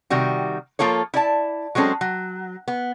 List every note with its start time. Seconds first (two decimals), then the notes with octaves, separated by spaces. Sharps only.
0.10 C3 D#3 G3 F#4
0.79 F3 A#3 F4 A4 C#5
1.14 E4 D5 A5
1.75 F#3 G#3 C4 C#4 A4
2.01 F#3
2.68 B3